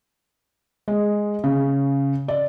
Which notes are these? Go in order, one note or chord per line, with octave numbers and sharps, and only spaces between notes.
G#3
C#3
D5